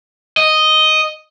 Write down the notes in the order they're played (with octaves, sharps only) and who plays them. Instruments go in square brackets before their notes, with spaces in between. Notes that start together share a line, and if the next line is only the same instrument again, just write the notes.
[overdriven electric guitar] D#5